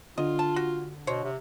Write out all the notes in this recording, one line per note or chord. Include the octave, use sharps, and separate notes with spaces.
D3 F4 D#5
A5
F#4
B2 C5 C#5
C3